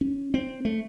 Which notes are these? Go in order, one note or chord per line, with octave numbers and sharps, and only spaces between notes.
C#4
C4
A3